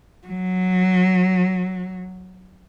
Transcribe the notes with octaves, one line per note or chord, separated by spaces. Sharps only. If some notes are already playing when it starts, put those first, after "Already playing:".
F#3